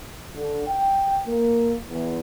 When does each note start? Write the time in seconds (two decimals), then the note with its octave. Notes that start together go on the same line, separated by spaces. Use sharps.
0.33 D3
0.66 G5
1.26 A#3
1.88 E2